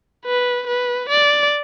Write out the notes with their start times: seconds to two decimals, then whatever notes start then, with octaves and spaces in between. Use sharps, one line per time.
0.26 B4
0.67 B4
1.09 D5